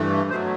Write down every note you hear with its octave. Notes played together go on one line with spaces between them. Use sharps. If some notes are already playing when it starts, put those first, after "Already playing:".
Already playing: G2 E3 A3
B2 F#3 A3 C5